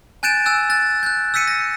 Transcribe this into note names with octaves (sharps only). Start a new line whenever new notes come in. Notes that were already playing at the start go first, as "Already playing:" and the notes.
G#5 F#6 G6 A6 D7 E7
G#5 E6 F#6
F#6 A6
F#6 G6
E6 G6 B6 C#7 D#7
A#6